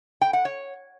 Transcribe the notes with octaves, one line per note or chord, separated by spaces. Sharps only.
G5
F#5
C#5